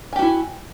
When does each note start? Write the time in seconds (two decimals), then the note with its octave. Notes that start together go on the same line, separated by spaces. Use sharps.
0.13 G#5
0.16 G4
0.19 F#4
0.22 E4